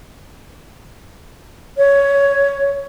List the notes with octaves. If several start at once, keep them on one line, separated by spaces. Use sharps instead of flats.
C#5